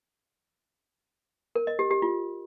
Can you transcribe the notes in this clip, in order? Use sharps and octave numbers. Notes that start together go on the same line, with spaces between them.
A#4
D#5
G4
G4
F4